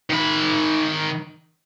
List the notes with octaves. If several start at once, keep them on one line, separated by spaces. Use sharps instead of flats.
D#3 B5